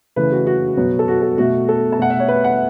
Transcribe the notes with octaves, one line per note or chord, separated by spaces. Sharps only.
C#3 E3 A3 B4
F#4
F#4
B2 F#3 B3
A4
F#4
A4
B2 A3 F#4
A4
A5
B2 A3 F#5
E5
C#5
B4
F#5